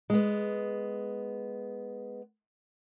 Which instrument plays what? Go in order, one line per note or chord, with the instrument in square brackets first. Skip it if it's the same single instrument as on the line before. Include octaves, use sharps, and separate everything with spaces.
[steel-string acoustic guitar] G#3 B3